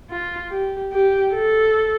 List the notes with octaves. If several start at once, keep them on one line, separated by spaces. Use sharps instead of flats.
F4
G4
G4
A4